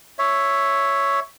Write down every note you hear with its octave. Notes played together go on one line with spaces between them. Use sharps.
C#5 E5